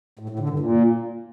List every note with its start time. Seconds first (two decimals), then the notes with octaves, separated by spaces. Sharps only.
0.19 A2
0.29 A2
0.39 D3
0.49 G2
0.59 A#2